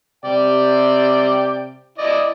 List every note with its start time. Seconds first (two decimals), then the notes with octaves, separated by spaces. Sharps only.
0.25 C3 D5 G5
1.98 E4 D5 D#5